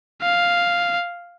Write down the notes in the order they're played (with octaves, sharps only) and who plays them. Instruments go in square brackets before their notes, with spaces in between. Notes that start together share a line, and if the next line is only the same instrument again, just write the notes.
[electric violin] F5